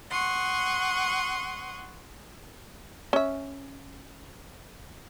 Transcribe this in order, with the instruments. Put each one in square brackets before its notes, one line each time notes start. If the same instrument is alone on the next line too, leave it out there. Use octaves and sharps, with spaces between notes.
[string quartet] F#5 C6 C#6 D#6
[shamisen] C#4 E5